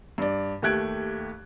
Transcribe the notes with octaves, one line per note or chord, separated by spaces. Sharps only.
G2 D5
D#2 A3 G4 F#6 G#6 D7